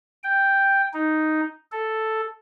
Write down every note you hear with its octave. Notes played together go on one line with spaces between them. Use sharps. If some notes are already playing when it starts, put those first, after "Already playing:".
G5
D#4
A4